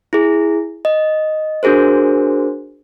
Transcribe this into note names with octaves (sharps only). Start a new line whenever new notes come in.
E4 G#4
D#5
D4 F#4 G#4 A#4 C5